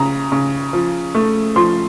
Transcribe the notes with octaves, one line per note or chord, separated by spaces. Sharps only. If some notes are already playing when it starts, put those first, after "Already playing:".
Already playing: C#3 A#5
C#3
F3
A3
F3 C6